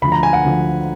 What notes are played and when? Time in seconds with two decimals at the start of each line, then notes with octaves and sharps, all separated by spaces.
0.02 D2 D3 F3 B5
0.12 A#5
0.23 G#5
0.33 F#5
0.44 D2 D3 F3